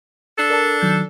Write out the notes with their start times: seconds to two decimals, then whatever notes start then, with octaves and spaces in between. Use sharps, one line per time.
0.38 D4 A4
0.50 A#4 D5 A5
0.82 D#3 F#3 G6